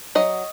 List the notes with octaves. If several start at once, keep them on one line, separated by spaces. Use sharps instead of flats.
F#3 D#5